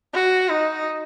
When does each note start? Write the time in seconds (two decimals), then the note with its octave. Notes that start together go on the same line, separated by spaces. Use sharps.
0.14 F#4
0.48 D#4